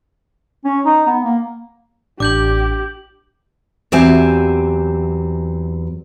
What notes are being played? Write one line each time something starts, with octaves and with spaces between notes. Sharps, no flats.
C#4
D#4
B3
A#3
A1 D4 G4 D6 G6 F#7
E2 F#3 C4 G4 E5 G#5